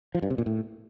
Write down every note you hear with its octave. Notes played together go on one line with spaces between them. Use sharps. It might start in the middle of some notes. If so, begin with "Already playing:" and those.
F3
G2
C3
A#2
A2